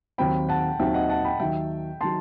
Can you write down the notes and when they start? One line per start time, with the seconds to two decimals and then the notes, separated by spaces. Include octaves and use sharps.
0.18 D#2 D#3 F#3 C4 G5 B5
0.49 F#5 A5
0.79 D#2 D#3 F#3 C4 E5 G5
0.94 D#5 F#5
1.10 F#5 A5
1.25 G5 B5
1.40 D#2 D#3 F#3 E5 G5
2.01 D#3 F#3 A5 C6